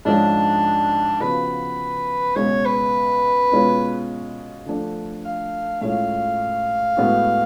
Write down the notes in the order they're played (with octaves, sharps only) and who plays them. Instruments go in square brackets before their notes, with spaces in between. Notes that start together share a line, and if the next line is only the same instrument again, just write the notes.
[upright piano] G#2 F3 G#3 C#4 [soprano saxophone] D4
[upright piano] C#3 F3 B3 F#4 [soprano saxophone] B4
[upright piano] C#2 B2 G#3 [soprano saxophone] C#5
[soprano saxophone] B4
[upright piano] B2 G#3 C#4 F4
D3 F3 A3 D4
[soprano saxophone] F5
[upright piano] A2 G#3 C#4 F4 [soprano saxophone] F5
[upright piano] A2 G#3 B3 F#4